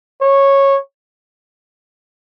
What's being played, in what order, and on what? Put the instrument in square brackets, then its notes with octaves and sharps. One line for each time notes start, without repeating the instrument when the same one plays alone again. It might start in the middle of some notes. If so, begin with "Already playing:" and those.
[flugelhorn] C#5